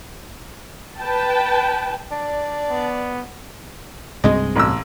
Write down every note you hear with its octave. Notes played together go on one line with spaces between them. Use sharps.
B4 G5 A5
D4 D5
B3
C2 G2 G#3 C4 D#5
A1 E6